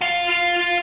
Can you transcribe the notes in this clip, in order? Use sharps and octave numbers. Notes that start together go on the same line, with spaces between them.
F4 F5